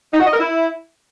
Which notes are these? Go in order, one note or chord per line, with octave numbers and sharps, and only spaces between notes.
D#4
F#4
D#5
A#4
E4